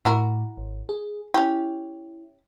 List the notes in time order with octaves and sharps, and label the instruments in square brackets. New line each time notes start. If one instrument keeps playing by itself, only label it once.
[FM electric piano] A2 [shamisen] E4 F#4 A#4
[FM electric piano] G#1
G#4
[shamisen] C#4 G4 [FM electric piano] E4